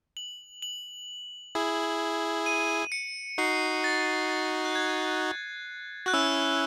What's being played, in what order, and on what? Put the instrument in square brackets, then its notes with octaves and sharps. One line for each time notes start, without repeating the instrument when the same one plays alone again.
[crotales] F#7
F#7
[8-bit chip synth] E4 G#4
[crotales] D#7
C#7
[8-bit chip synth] D#4 F#4 [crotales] C7
[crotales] A6
A6
F#6
G#6
[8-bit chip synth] F#4 [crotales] F#6
[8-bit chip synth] C#4 E4 [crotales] E6